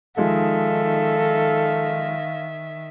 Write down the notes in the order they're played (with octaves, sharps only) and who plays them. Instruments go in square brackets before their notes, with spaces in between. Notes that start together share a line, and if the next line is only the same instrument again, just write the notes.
[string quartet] D#3 E5 [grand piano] F3 G#3 D#4 [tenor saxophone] A4 [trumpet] F5